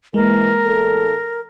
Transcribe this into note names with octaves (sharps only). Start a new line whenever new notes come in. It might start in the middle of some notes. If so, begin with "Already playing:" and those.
G#2 E3 G#3 A#3 A#4
E2 A2 A4